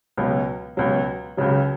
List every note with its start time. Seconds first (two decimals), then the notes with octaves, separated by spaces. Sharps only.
0.17 C#2 B2 F#3
0.77 C#2 B2 F#3
1.37 C#2 C#3 F#3